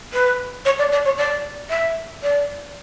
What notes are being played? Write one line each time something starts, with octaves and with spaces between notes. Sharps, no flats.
B4
C#5
D5
D5
C#5
D5
E5
D5